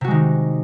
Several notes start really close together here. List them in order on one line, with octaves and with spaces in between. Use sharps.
C3 F#4 G#3 D#3 D#4